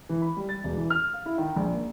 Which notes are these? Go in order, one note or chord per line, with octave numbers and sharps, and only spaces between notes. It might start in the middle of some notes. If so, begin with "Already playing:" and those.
E3
B5
G3
A6
E1
E3
F6
F5
E4
D#3
A#1
A#3